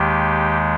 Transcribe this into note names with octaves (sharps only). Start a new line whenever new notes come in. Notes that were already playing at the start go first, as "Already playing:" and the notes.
Already playing: D#2 D#3 G#3 G4